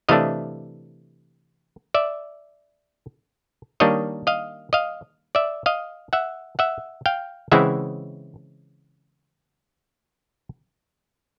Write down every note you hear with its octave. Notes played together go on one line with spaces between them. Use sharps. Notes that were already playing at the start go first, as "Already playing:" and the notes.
C3 E3 A3 D4 D#5 F5
D5 E5
D#3 G3 A#3 D4 C#5 D#5
D#5 F5
D#5 F5
D5 E5
D#5 F5
E5 F#5
E5 F#5
F5 G5
C#3 E3 G#3 C4 E4 E5 F#5